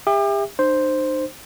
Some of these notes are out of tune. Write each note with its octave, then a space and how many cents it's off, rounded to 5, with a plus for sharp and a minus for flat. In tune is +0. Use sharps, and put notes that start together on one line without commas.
G4 +40 E5 +0
D#4 -45 C5 +0